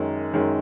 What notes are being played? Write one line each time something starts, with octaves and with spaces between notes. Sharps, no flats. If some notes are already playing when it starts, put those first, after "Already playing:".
Already playing: F#2 D#3 G#3
F#2 D#3 G#3